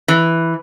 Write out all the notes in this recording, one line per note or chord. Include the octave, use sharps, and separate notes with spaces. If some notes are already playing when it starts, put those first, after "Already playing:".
E3